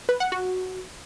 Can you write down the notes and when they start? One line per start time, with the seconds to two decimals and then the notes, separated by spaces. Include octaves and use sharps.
0.09 B4
0.20 F#5
0.32 F#4